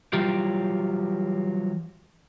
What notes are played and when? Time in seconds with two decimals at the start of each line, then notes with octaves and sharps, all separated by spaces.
0.13 E3 F#3 G3 F4 G4